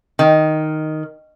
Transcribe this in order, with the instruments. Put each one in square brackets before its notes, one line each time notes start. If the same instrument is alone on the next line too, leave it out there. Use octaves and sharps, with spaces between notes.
[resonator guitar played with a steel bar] D#3